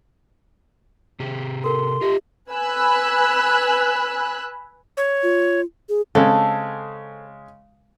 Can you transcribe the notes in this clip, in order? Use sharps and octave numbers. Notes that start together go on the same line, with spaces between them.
C3 G4 G#4
A4 A#4 C6
F4 G4 D#5 E5
B4 G#5 B5 E6 F#6
C#5
F4
G#4
C#3 G#3 C4 A4